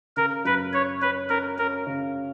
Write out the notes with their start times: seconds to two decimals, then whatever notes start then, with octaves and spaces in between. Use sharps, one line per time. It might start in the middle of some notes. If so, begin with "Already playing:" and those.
0.17 C#3 A#4
0.45 F#2 B4
0.73 C#4 C#5
1.02 C#4 B4
1.30 C#4 A#4
1.58 C#4 A#4
1.87 C#3